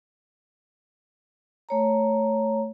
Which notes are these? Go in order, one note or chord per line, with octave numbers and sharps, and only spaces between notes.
A3 C#5 A#5